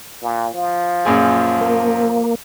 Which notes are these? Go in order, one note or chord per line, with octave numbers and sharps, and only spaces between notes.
A#2
F3
F#2 A#2 G#4
A#3